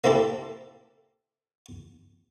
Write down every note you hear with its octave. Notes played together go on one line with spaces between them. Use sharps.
A#3 C4 E4 G4 A4